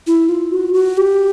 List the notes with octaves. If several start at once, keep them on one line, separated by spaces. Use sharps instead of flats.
E4
F4
F#4
F#4
G4